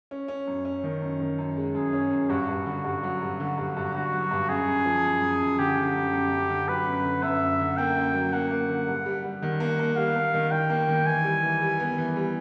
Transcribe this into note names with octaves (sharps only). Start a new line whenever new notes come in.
C#4
C#4
F#2
C#4
D#3
F#2
D#3
F#2
G#3
F#2 G#4
C#4
F#2
G2 F#4
G2
D3
G2
F#3
G2
D3
G2
G2
D3 F#4
F#3
G2
F#2 G#4
F#2
F3
F#2
F#2
F#2
D3 G4
D3
F#2
F#2
F#2
D3
F#3 B4
F#2
D3
F#2 E5
F#2
D3
A#3 G5
F#2
F#3
A#3 F#5
A#3
D3
G2
G3
G3
D#3 F#5
A#3
A#3
G3 F5
A#3
D#3
D#3 G5
A#3
D#3
E3 G#5
G3
E3
G3
B3
E3
G3